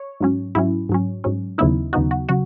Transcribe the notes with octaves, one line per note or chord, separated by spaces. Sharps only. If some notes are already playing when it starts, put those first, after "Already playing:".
Already playing: C#5
G#2 F#3 C#4
G#2 F#3 C#4 E4
G#2 F#3 C#4
G#2 F#3 C#4
D#2 C#3 F#3 B3 D#4 E4
D#2 C#3 F#3 B3 D#4 F#4
F#4
C#3 F#3 F#4